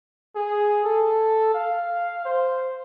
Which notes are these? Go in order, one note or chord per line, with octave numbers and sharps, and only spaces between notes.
G#4
A4
F5
C5